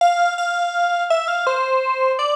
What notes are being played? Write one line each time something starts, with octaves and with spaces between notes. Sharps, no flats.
F5
F5
E5
F5
C5
D5